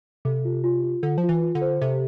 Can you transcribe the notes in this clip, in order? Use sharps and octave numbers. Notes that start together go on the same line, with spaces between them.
C3 A4
F4
F4
F4
D3 F4
F3
F4
E3
F4
D3
C5
C3 A4